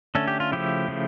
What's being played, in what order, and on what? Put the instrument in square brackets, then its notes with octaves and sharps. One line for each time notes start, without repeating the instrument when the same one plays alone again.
[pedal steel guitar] D3 A3 C#4 A4
G4
F4
C#3 F3 A3 E4 G4
C#3 F3 A3